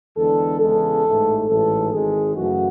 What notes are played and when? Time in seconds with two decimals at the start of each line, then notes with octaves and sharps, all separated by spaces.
0.17 E2 D3 G#3 A4
0.61 E2 C#3 G#3 A4
1.04 A1 G#2 E3 A3
1.48 A1 G#2 E3 A4
1.92 G#1 G#2 G#3 G#4
2.35 F#2 C#3 E3 A3 F#4